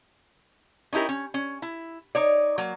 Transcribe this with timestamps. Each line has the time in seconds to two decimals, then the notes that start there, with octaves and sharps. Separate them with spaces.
0.93 C#4 D#4 E4 G4 A#4
1.09 C#4
1.34 C#4
1.62 E4
2.15 D#4 C#5 D5
2.58 F#3 A#3